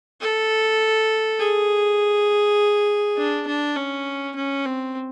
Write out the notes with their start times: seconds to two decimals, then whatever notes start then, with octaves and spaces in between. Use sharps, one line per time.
0.21 A4
1.39 G#4
3.17 D4
3.47 D4
3.76 C#4
4.36 C#4
4.65 C4